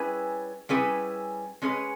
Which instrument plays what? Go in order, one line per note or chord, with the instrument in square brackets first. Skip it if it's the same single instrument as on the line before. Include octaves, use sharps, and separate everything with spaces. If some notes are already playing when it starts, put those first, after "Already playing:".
Already playing: [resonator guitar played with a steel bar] G3 C#4 E4 G#4 B4
G3 C#4 E4 G#4 B4
G#3 C#4 G#4 B4